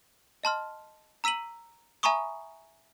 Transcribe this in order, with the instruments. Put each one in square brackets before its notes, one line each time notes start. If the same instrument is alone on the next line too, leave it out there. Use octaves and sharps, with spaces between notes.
[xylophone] D#5 A5 C6 F6
A#5 E6 B6 D#7 F#7
E5 G#5 A#5 B5 C#6 D#6